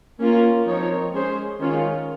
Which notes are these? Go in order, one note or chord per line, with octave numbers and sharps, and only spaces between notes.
A#3 C#4 F4 A#4
F3 C4 D#4 A#4 C#5
G#3 C#4 G#4 C5
D#3 G#3 C#4 F4